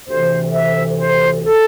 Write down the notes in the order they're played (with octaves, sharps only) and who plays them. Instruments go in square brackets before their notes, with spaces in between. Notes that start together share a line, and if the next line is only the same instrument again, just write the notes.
[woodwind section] D2 C3 E3 C5
E5
C5
A4